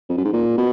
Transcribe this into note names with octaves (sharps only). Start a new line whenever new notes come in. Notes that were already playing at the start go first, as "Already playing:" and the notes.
F2
F#2
G#2
A#2
B2